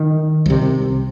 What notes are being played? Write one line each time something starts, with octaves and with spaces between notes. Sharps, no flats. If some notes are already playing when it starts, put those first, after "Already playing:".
Already playing: D#3
C2 C3